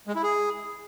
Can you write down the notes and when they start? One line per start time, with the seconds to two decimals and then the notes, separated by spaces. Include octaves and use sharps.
0.07 G#3
0.15 E4
0.23 G#4